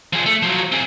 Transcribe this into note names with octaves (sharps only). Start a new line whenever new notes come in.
F3 G#4
A3
F3 F#3
C4 G#4